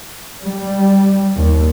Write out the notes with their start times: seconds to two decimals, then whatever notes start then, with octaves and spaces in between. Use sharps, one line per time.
0.44 G3
1.36 D#2